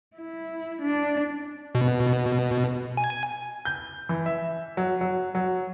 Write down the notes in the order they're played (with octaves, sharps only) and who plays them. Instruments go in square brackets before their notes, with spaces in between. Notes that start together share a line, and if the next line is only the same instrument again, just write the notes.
[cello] E4
D4
[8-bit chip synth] B2
G#5
[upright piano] G6
E3
E5
F#3
F#3
F#3